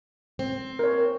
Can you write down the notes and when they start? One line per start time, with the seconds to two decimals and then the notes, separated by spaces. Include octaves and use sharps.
0.39 C4
0.79 A#4 C#5